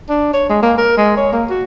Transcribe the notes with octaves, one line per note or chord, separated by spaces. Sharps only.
D4
C#5
G#3
A#3
A#4
G#3
C#5
A#3
F#4